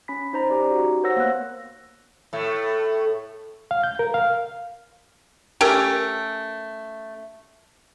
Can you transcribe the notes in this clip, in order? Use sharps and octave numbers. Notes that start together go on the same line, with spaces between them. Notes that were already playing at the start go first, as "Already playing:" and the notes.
C#4 B5 B6
D#4 C5 A#5
C#4 G4 D5 A#5
D#4 F#4
A#4 C5 C#5 F#5 E6 A#6
A#3 B3 F#6
A2 A3
F5
G6
A#4
F5
A3 C#4 G4 A#4